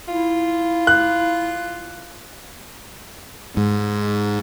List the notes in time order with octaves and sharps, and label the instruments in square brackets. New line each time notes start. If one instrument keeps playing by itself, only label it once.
[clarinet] E4 [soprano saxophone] F4
[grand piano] F#6
[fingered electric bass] G#2